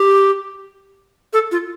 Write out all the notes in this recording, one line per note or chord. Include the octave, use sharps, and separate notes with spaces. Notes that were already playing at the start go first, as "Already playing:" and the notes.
Already playing: G4
A4
F4